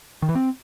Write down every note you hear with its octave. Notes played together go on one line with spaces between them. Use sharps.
D#3
E3
C4